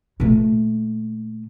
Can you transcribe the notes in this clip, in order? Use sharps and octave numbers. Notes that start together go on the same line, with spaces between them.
A#2 A3